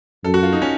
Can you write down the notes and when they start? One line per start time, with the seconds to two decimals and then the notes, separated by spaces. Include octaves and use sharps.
0.24 F#2 A4
0.34 F#4
0.43 F4
0.52 D#4
0.62 C#4